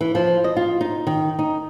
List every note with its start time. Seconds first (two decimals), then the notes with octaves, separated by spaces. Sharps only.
0.01 E3
0.15 F3
0.44 D#5
0.57 F4
0.81 D#4
1.07 D#3
1.39 D#4